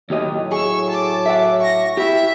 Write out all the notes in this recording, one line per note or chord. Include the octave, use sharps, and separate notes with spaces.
D#2 A2 F#3 G4 C#5 D#5
G#4 C#6 E6
A5 D6
E5 F#5
C#6 A#6
E4 G4 E5